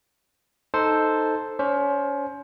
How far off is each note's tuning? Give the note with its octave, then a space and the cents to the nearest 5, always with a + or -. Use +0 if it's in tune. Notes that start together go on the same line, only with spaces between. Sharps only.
D#4 +0 A4 +0 C5 +0
C#4 +30 C5 +20